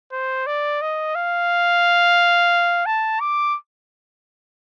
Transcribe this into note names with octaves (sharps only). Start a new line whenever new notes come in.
C5
D5
D#5
F5
A5
D6